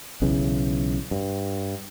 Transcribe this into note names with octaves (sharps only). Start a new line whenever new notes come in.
B1 C#3 E3
G2